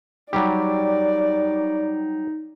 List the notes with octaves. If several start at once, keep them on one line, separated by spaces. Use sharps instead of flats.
F#3 G3 D#4 G4 D5